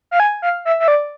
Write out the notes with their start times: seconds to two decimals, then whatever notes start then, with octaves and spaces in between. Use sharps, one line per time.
0.11 F5
0.20 G#5
0.42 F5
0.65 E5
0.80 E5
0.88 D5